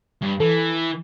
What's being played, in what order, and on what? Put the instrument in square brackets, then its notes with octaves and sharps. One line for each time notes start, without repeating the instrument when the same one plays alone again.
[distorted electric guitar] G2
[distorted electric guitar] E3 [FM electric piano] A4